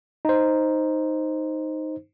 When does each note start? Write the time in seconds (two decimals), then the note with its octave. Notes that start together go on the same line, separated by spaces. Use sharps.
0.25 D#4 C5